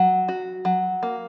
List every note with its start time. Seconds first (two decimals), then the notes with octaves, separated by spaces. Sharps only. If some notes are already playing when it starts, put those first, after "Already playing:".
Already playing: F#3
0.29 F#4
0.65 F#3
1.03 A#3